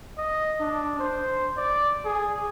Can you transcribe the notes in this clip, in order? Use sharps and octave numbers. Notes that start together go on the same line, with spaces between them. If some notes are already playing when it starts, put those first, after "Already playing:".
D#5
D4
C5
D5
G#4